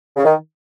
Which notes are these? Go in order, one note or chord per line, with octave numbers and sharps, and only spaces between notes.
C#3
D#3